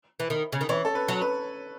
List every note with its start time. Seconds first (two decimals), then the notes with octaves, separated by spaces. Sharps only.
0.20 E3
0.30 D#3
0.52 C#3
0.61 D#3
0.69 E3 C#5
0.85 A4
0.95 B4
1.08 F#3
1.22 B4